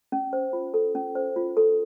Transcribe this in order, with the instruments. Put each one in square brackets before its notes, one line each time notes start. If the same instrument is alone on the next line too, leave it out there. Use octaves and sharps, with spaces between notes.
[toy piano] C#4
C5
F4
A4
C#4
C5
F4
A4